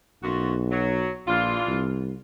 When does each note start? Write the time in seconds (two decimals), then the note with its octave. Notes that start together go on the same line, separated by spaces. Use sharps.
0.23 B1 F#2 F4 F#4
0.71 F#3
1.27 A#1 E3 D4 F4
1.67 C2